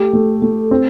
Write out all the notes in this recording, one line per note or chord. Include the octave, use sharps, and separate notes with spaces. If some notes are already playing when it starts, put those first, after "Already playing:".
Already playing: A3 G4
A3
A3
C4